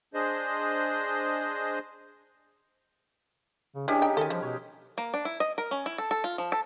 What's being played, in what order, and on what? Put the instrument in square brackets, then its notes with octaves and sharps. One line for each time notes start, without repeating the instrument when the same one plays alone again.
[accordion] D4 G#4 C5 D#5
[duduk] C#3
[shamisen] E3 [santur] G#3 C#4 G4 [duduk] D4
[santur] D#4 [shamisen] G5
[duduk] D#3 [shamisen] A4 G#5
[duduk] F3 [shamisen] G3
[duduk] B2 [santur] C#5
[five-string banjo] A#3
D4
E4
D#5
A#4
C#4
E4
A4
A4
F4
F3
A4